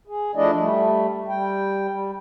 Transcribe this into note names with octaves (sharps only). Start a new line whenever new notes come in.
G#4
F3 A3 D4 E4 D5 D#5
G3 A3
G3 G5
G3